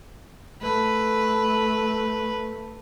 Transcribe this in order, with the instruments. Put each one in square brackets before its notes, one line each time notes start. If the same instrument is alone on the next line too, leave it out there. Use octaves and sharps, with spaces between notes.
[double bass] A3 [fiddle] B4